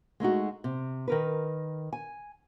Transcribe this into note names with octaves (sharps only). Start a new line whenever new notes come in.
G#3 A3 D#4 F#4
C3
D#3 A#4 B4
G#5